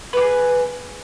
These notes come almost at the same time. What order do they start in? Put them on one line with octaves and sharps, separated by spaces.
B4 G4 G#4